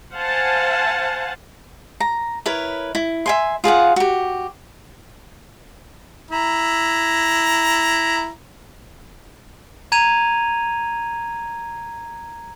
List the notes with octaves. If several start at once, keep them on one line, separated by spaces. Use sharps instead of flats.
C5 F5 F#5 G#5 A5
A#5
E4 A#4 B4 C#5
E4
E5 G#5 C6
F4 G#4 F5 F#5
F#4 G4
E4 A#5
A#5 G#6 D#7 F7